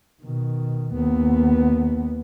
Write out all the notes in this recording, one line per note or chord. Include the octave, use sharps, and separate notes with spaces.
B2 D#3
D#2 B3